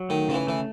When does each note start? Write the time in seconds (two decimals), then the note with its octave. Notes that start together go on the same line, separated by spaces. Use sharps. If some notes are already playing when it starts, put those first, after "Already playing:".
Already playing: F#3
0.09 D#3 A3
0.28 C#3 F3
0.34 E3
0.47 E3 A3